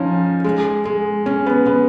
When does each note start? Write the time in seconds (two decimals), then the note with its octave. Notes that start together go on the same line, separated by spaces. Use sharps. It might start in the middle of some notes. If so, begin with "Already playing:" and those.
Already playing: F3 C#4 D#4
0.44 G#3
0.85 G#3
1.26 C#4
1.46 B3
1.66 B3